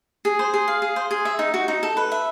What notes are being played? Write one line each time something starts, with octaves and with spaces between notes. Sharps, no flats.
G#4
C5
G#4
F5
G#4
C5
G#4
E5
D#4
F#4
D#4
A4
B4
E5